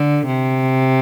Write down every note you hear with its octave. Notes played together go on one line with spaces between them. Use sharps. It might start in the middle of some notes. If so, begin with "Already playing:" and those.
Already playing: D3
C3